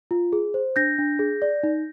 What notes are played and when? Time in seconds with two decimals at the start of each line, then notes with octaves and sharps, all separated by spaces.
0.11 F4
0.33 G#4
0.54 C5
0.76 D4 G6 A#6
0.98 D4
1.19 G#4
1.42 D5
1.63 D#4